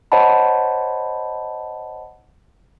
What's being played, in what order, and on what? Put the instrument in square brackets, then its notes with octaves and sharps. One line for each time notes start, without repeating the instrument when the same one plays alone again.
[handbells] C5 C#5 D#5 F#5 A5 B5